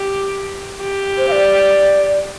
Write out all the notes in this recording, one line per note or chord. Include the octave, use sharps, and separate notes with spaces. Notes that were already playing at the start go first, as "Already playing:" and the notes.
Already playing: G4
G4
C5
F5
D5